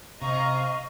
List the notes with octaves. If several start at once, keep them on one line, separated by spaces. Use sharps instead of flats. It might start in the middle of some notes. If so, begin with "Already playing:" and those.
C3 C5 D#5 F5 A#5 C#6